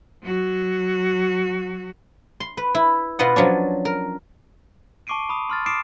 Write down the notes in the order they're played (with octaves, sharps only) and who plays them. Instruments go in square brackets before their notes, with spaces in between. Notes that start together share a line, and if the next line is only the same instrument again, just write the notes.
[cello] F#3 F#4
[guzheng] C6
B4
E4
B2 F4 B4 D#5 F#5
F3 F#3 C#4 D4
A#4
[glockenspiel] A5 C#6 D6 C7 D7 D#7
B5 D#6
C6 F6 A6
D6 D#6 C7 D7 E7